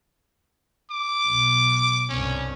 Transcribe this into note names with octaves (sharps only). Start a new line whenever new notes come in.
D6
B1
C2 G2 C#4